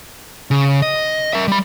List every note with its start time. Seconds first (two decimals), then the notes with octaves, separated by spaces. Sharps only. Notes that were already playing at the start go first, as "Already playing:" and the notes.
0.51 C#3
0.82 D#5
1.33 A#4 E5
1.48 G3 B5